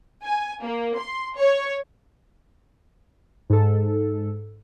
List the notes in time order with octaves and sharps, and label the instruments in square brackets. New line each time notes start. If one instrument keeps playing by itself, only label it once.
[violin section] G#5
A#3
C6
C#5
[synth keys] G#2 A4